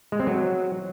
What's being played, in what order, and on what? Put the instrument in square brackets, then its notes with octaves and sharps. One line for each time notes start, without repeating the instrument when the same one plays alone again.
[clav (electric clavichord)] G#3
C4
F#3